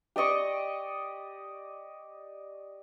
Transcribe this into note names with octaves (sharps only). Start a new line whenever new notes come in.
G4 D5 D#5 C#6